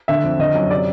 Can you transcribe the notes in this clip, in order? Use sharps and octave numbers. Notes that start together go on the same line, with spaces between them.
D3 E5
F2
D3 D#5
F#2
C3 D5